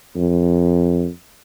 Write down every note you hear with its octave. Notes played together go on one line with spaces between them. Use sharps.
F2